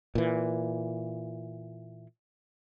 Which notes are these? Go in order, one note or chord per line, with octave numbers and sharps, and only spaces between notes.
A#2 E3